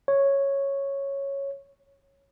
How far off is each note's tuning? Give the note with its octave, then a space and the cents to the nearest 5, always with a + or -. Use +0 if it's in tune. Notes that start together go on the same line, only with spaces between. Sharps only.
C#5 -5